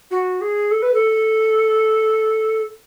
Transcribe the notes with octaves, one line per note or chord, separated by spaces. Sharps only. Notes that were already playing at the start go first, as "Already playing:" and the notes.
F#4
G#4
A4
B4
A4